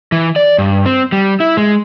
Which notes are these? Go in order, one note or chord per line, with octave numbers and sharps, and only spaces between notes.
E3
D5
G2
C4
G3
E4
G#3